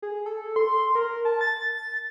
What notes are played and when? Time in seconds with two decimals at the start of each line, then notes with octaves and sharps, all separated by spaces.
0.02 G#4
0.26 A4
0.56 C6
0.95 A#4
1.25 A5
1.41 A6